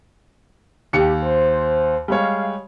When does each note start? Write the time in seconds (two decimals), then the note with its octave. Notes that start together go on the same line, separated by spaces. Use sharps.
0.93 D#2 G4 C#7
1.22 C5
2.08 G3 G#3 C#5 F5